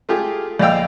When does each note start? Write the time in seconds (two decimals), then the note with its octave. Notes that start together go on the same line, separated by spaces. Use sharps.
0.09 A3 F4 G4 G#4
0.59 A#1 D5 D#5 F5 G5 E6